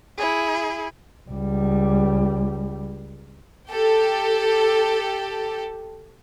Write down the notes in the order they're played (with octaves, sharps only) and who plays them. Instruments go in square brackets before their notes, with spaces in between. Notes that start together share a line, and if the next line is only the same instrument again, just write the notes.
[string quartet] E4 G#4
[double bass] C#2 G3
[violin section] G4 A4